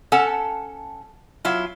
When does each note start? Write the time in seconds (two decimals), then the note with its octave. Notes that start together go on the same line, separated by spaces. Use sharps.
0.12 C#4 A4 F#5 A5
1.45 F#3 E4 F4